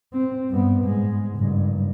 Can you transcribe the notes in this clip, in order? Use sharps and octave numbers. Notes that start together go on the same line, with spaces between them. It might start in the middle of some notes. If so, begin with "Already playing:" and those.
C4
G2 B3
G#2 G#3
F#1 G2